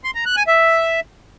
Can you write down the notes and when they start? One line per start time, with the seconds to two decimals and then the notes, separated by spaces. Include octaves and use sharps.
0.04 C6
0.15 A#5
0.25 F#6
0.36 G#5
0.47 E5